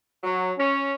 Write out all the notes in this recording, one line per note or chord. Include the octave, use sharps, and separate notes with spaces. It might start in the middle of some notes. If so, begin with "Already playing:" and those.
F#3
C#4